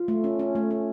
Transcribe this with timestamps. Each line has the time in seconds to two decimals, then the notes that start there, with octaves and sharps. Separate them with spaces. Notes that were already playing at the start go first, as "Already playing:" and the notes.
Already playing: F4
0.08 A3
0.24 C#4
0.39 C#4
0.55 A3
0.71 C#4